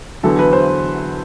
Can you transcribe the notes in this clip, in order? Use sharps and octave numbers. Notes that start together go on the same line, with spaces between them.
E2 D3 F#3 A4
B4
C5